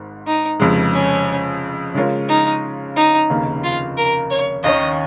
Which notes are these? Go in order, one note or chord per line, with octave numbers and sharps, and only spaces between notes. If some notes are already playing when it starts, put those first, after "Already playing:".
Already playing: G#1 G#2
D#4
F1 F2 C#3 G#3
C#4
C#3 G#3 F4 A#4 C#5
D#4
D#4
F1 D#2 C#3 A#3
F4
A#4
C#5
D#2 D#3 C#4 D#5